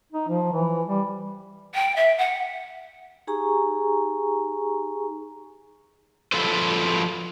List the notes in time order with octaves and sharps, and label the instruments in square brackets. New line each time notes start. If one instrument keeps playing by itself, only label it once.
[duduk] D#4
F3
E3
G3
[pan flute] G5
E5
F#5
[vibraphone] D#4 G4 G#4 G#5 A#5 C#6
[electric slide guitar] F3 F#3 F4 A4 B4 C5